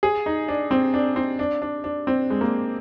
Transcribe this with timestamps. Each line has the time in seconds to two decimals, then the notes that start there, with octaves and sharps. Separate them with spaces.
0.03 G#4
0.26 D#4
0.48 D4
0.71 C4
0.94 D4
1.16 C4
1.39 D4
1.62 D4
1.84 D4
2.07 C4
2.30 G#3
2.41 A#3